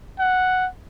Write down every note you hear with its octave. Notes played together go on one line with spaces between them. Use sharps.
F#5